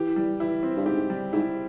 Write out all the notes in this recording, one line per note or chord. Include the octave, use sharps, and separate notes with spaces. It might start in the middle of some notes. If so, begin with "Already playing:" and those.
Already playing: E3 G4
G3
E3 E4
C4
G2
G#2 G4
G3
G#2 E4